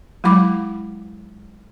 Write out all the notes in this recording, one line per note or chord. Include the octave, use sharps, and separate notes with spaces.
F#3 G#3 E4 B5 D6